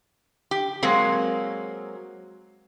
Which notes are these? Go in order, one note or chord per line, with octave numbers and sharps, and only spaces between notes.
G4
F#3 G#3 A#3 C4